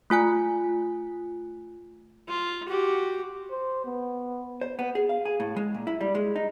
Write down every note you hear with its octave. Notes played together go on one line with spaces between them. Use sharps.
A3 F4 G#5 F#6
F4
F#4 G4
C5
B3
C5
B3
G#4
F5
G#4
A2
G#3
A#2
E4
G3
G#3
D#4